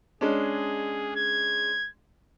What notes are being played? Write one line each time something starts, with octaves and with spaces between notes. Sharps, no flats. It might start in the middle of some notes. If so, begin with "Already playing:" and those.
G#3 C#4 D4 G#4
G#6